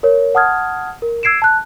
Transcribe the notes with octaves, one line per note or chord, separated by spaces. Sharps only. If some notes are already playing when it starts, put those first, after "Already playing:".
A#4 C#5
F#5 A5 D#6 F6 G#6
A#4
E6 G#6 C7 D7 E7
A5 F#6